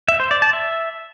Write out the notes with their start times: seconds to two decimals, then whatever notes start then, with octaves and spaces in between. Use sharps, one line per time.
0.08 E5
0.20 C5
0.31 D5
0.42 A5
0.53 E5